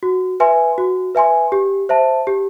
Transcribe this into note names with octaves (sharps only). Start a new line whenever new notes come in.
F#4
B4 E5 G#5 C6
F#4
B4 E5 G#5 C6
G4
C5 E5 A5
G4